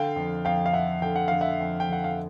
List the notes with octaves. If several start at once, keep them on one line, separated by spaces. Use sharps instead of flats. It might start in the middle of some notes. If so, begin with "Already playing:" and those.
Already playing: D3 F5 G5
F2
F2 F5 G5
F5
F2 E5 F#5
D3 G5
F#5
D3 F5
E5 F#5
F2
G5
D3 F#5
F5